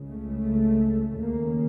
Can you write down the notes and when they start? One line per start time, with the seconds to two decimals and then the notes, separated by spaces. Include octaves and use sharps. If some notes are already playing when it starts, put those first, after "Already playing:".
Already playing: C#2 C#3
0.09 A3
1.20 D#2 C#3 A#3